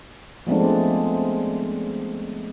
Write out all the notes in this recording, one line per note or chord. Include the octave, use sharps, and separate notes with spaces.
F3 G#3 A3 B3 C4 D4